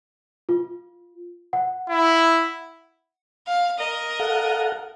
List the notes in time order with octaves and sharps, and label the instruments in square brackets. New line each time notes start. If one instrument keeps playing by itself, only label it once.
[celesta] F4
F#5
[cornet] E4
[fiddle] F5
A#4 D#5
[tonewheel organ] A4 F5 F#5